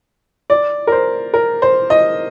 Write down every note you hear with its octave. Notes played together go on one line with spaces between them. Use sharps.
D5
A#4
C5
A#4
C5
D#5